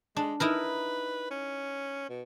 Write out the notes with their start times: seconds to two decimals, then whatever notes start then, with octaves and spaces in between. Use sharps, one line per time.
0.17 G#3 D4
0.40 D#4 E4 A#4 B4
1.31 C#4
2.10 B2